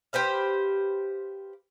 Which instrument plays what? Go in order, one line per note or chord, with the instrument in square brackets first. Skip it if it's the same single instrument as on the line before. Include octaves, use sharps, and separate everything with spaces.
[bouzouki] G4 B4 C5 F5